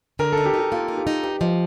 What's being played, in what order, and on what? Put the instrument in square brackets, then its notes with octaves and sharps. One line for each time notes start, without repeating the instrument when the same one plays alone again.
[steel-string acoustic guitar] D3 [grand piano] A#4
[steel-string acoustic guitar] D#4 [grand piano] A4
[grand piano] G4
[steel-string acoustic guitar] D#4
[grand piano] G4
[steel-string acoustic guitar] A#3 [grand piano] F4
[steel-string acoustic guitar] D#4
[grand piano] G4
[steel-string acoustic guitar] D#4
[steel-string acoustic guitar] G2 [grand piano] G4
[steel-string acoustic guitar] F3 [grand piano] D#5